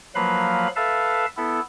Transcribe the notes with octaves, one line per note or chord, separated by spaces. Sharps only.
F3 F#3 A#3 B4 F5 B5
A4 B4 E5 F5 A5
B3 E4 A4